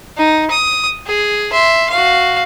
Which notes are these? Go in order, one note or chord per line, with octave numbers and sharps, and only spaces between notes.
D#4
D#6
G#4
E5 C6
F#4 F5